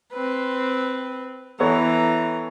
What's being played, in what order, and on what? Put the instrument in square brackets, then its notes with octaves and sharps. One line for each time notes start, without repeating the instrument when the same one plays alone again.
[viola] C4 B4
[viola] E3 A#5 [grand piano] B3 A4 C#5